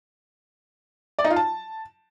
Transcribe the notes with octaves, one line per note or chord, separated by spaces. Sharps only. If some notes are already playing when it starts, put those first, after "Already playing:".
D5
D#4
F4
A5